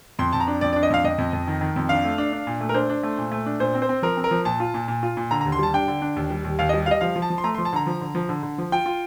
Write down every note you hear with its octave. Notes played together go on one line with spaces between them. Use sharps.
F2 C6
F2 A5
A#5
D4
F2 D5
D5
D4
D#5
F2 F5
F2 D#5
F2
F2
D#3
D#3
F2
D4 F5
A3
D4
D4
A#2
A3
A#4
D4 C5
D4
A3
A#2
A3
D4
A#2 C5
C4
C5
C4
F3 A#4
C4
A#4
F3
A#2 A5
F4
A#2
A#2
F4
A#2
D3 A#5
A#5
D#2
C6
G3 A5
D4 G5
D3
D4
D#2
G3
D#2
D#2 F5
D#5
G3
G3 D#5 F5
F3 F5
F3
A5
F3
C6
A3 A#5
C6
F3
A5
D3 A#5
F3
D3
F3
D3
D3
F3
F4 G5
F4